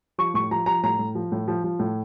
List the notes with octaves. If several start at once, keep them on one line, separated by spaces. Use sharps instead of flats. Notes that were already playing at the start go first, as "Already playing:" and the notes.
F3 C#6
A2 C#6
F3 A#5
F3 A#5
A2 A#5
A2
F3
A2
F3
F3
A2